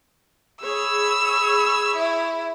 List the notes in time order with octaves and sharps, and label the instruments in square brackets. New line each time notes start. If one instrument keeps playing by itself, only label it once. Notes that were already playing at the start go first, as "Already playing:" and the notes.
[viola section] G#4 C#5 B5 [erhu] E6
[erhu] E4